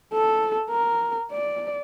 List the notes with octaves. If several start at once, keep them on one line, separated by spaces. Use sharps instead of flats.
A4
A#4
D5